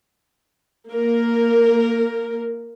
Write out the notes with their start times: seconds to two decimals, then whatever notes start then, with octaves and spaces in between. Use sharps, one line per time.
0.90 A#3 A#4